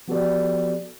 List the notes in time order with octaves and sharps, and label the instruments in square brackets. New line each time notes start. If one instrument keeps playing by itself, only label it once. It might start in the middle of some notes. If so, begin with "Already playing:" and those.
[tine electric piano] F3 B3 F#4 G4 A4 D5